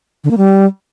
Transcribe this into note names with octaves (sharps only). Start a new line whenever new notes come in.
D3
A#3
G3